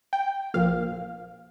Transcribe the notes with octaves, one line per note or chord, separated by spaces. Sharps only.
G5
A#1 A#2 F3 A#3 F5